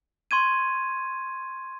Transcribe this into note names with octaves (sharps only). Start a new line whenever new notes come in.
C6 C#6 G#6 D#7